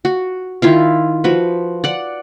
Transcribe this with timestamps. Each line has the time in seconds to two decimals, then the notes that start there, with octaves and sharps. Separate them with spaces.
0.05 F#4
0.62 D#3 E4 F4 F5
1.24 F3 F#4 B4
1.84 D5 F#5